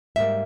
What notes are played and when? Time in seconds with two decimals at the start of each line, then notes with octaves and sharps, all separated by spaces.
0.16 G#2 G3 A#3 E5